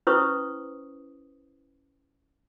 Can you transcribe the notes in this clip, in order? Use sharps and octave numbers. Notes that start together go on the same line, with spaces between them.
C#4 E4 B4 C5 C#6 D#6